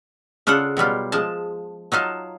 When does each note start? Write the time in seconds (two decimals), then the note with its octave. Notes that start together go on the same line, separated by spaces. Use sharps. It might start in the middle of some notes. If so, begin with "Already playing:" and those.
0.47 C#3 D4 F4 A4 F#5
0.77 B2 F#3 G3 F4
1.12 F3 G#3 A5
1.92 F#3 D#4 F4 A5